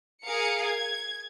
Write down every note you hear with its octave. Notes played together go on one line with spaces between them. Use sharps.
G#4 A#4 F5 C#7
G#6